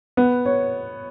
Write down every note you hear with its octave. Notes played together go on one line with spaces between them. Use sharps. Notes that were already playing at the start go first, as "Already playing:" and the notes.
B3
C#5